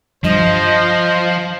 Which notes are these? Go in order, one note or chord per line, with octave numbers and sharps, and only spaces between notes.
G2 F3 C5 D#5